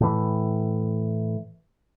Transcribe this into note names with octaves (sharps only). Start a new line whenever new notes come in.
A2 E3